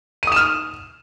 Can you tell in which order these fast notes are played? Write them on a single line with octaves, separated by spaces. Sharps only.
D#7 D#6 E7 F6